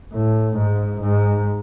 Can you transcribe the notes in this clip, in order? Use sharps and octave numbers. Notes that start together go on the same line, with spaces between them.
A2
G#2
G#2